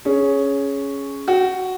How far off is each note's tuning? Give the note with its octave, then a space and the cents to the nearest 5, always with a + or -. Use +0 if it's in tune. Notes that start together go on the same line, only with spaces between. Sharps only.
C#4 +0 G#4 +10
F#4 +0 G5 -25